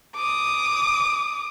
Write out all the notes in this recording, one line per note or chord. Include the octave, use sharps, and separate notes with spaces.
D6 D#6